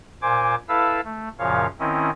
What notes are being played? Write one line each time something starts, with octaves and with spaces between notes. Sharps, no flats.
A#2 C5 G#5 D6
E4 A4 B4 F5 A5 E6
A3
F#2 A#2 C#3 F3 C#5 F5
D#3 C4 C#4 E4 D#5